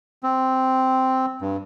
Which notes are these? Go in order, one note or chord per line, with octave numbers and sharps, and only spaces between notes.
C4
G2